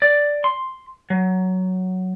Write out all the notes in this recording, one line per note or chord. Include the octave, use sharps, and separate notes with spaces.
D5
C6
F#3